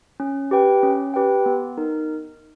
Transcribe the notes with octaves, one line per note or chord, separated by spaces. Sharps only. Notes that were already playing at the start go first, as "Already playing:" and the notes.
C#4
G4 B4 G5
C#4
G4 B4 G5
B3
D#4 A#4